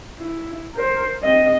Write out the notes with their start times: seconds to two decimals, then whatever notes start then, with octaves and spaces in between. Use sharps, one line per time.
0.18 E4
0.74 A#4 C5
1.22 C4 D#5